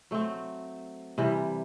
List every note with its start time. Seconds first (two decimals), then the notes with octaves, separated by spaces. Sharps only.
0.11 F#3 A3 C4
1.18 C3 E3 G3